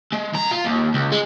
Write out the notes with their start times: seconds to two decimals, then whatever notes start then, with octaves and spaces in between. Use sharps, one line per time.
0.12 G#3
0.34 F2 A#5
0.51 F4
0.65 D#2
0.94 C#2
1.12 G#3